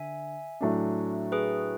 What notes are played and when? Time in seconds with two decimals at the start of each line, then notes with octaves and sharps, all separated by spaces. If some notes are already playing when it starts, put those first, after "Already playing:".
Already playing: D3 E5 G#5
0.61 A2 F#3 A3 D4
1.32 G#4 B4